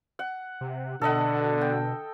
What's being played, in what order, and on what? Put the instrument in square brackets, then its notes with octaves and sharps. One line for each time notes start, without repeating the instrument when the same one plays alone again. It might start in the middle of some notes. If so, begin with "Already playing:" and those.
[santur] F#5
[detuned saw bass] C3
[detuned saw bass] B2 [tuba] D3 [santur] A4 D#5 F#5
[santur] G5